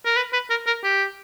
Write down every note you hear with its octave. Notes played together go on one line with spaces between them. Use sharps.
A#4
B4
B4
A#4
A#4
G4